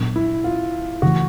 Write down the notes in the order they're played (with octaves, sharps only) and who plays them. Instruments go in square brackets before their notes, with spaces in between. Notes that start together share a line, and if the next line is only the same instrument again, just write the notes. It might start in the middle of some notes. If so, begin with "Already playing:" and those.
Already playing: [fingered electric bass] A#2 F#3 B3 D4
[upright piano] E4
F4
[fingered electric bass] C#3 E3 A3 [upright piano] F#4